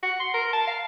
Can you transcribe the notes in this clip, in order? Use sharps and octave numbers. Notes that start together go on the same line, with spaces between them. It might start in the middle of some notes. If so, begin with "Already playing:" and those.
F#4
C6
A#4
A5
F5